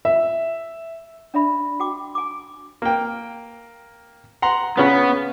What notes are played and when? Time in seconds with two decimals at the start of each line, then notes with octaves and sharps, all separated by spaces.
0.05 E5
1.34 D4 D5 E5 B5
1.80 F#4 G5 D6
2.15 G#5 D6
2.82 A#3 G5
4.42 F#5 A#5 C6
4.77 C#3 B3 C#4 B4